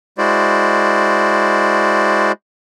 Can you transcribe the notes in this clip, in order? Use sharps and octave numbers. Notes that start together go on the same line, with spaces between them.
G#3 E4 F#4 C5 D5